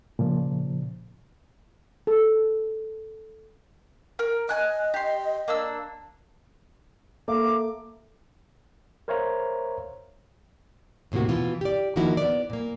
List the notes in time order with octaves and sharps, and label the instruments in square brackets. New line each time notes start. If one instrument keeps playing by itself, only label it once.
[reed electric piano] A#2 C#3 F3
[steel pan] A4
[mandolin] A#4
[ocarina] D#5 [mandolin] G#5 F#6
[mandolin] G4 C6
A#3 D4 E6
[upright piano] A#3 [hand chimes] A4 E5 [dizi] D6
[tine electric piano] A#4 C5 C#5 E5 F5 A#5
[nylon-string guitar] D#2 A2 C3 A#3 F#4
B2 E3 F4
G4 D5
D#3 F3 A#3 D#4 E4 F#4
B3 D5
A#2 A#3